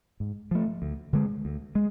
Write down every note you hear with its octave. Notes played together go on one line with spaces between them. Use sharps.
G#2
F3 A3
D2
D3 G#3
D2
G#3